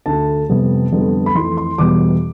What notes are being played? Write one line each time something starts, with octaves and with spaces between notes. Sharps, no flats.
D2 D3 A3 A5
F2 C3 G3 B3
F2 D3 G3 B3
B5
F2 E3 A3 C6
C6
E2 B2 G3 B3 D6